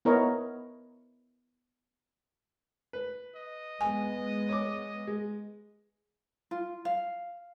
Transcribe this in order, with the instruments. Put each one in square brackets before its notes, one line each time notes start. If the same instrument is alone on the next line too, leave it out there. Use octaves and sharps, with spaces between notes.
[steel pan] B3 E4 A#4 B4 C#5 D#5
[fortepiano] B4
[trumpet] D#5
[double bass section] G#3 B3 [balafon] G#5
[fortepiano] C#5 D6
G#3
[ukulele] F4
F5